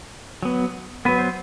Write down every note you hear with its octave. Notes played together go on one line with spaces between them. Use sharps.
F#3 B3
F#3 B3 B4
C5